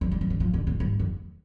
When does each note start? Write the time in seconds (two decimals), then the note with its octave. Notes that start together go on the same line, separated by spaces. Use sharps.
0.01 F3
0.12 G3
0.21 F3
0.30 D3
0.40 F3
0.53 D3
0.67 A#2
0.80 G2
0.99 F2